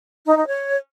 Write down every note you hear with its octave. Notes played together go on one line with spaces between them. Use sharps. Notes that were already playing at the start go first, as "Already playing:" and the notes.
D#4
D#4
C#5